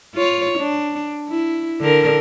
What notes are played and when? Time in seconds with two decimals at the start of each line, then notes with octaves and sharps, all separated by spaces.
0.15 F4 C#5
0.59 D4
1.29 E4
1.81 D3 A#4